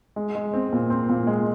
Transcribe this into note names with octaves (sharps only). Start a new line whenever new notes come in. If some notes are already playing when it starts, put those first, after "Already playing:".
G#3
G#3
C4
A#2
C4
A#2
G#3